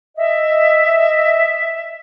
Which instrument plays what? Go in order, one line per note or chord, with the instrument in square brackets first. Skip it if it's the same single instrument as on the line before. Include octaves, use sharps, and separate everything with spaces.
[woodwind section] D#5 E5